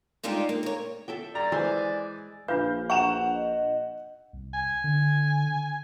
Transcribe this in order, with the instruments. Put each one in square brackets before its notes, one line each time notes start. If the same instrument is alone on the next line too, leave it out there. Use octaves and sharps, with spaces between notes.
[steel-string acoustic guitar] G3 G#3 D4 D#4 F4 G4
A#3
A#4 C#5
[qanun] A4 E5 G5
[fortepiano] G2 A#5 [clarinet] D5
[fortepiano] E3 C5 G#5 [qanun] G#3
[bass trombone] A#1 [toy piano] D4 F4 B4 [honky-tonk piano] F5 G6
[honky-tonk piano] F#5 E7 F7 [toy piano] A5 A#5 C#6
[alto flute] D#5
[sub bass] C2
[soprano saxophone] G#5
[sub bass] D3